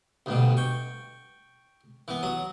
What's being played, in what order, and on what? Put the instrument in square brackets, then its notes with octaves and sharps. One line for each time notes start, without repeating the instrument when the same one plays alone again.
[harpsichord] D2 G2 B2
G5 C#6
E3 B3
F#3 D#6